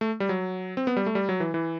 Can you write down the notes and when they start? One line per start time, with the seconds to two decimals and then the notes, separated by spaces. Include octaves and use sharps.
0.01 A3
0.20 G3
0.29 F#3
0.77 C4
0.87 B3
0.97 G3
1.06 A3
1.15 G3
1.29 F#3
1.40 E3
1.54 E3